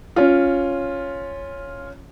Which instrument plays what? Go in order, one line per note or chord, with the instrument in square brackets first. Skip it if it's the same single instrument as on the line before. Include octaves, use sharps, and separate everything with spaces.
[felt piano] C#4 F4